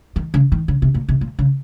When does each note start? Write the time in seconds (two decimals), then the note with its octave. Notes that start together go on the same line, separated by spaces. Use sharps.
0.16 D#3
0.34 C#3
0.52 D#3
0.68 C#3
0.82 C3
0.94 A#2
1.08 C3
1.21 A#2
1.39 C#3